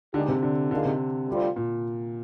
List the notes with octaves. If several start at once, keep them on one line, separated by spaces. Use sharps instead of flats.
A#2 D3 G#3 D#4 G4
C3
D3
D3 D#3 A#3 D4 F4 G#4
C3
D2 D3 G3 C4 F4
A#2